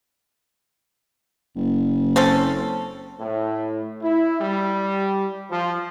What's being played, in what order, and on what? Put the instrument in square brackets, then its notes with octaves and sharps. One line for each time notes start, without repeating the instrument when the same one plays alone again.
[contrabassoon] F#1
[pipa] C4 C#4 A4
[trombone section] A2
E4
G3
F3